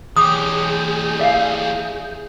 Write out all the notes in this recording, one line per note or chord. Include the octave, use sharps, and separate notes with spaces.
E3 G4 G#4 D6 D#6 G6
D5 E5 F5